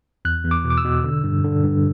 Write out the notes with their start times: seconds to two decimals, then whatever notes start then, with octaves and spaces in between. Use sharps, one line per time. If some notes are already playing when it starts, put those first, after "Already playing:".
0.25 E2 F#6
0.44 E2
0.51 D6
0.64 B2
0.70 D6
0.77 E6
0.84 B2
1.04 D3
1.24 G2
1.44 D3
1.64 G2